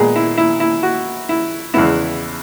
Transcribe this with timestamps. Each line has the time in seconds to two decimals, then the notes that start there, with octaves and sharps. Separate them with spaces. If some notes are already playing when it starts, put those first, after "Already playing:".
Already playing: A#2 G#3 B3 G#4
0.16 E4
0.37 E4
0.60 E4
0.83 F#4
1.29 E4
1.74 E2 C#3 G#3 B3 E4